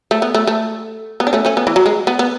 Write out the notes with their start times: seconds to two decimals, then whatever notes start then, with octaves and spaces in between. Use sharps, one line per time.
0.11 A3
0.22 B3
0.34 A3
0.47 A3
1.20 B3
1.27 D4
1.33 A3 C#4
1.45 A3 C#4
1.57 B3
1.67 E3
1.76 F#3
1.86 G#3
2.07 B3
2.19 B3